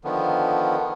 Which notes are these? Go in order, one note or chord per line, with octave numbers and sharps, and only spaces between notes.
D3 D#3 F3 B3